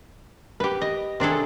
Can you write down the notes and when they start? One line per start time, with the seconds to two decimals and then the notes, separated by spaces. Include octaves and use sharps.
0.60 G4 B4
0.81 D#5
1.20 C3 D4 G#4 A4